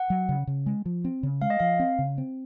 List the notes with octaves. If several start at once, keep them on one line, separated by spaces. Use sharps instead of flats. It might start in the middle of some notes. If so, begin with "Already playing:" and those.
Already playing: F#5
F#3
C#3
C#3
G#3
F3
C4
C#3
G#3 F5
D#5
F3 F5
C4
C#3
C4